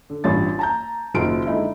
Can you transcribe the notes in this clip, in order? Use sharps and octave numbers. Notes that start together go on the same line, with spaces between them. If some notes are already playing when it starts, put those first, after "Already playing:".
D3
A1 G2 G3 F4 C#5 A6
A5 A#5 G6
F#1 D#3 F#3 F4 F6 D7
D3 G#3 D#4 E4